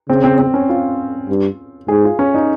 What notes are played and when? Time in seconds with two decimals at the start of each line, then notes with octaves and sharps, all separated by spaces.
0.09 C#3 C4
0.24 C4
0.38 C4
0.54 C#4
0.69 F4
1.29 G2
1.88 G#2 G#4
2.04 F4
2.19 C#4
2.34 D#4